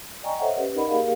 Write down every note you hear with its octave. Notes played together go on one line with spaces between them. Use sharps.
D5 D#5 G5 G#5 A#5 C#6
A4 C5 C#5 D#5 E5 F#5
C#4 G4 B4
D#4 A#4 D5 D#5 F#5 B5
A#3 G4 G#4 A#4 F5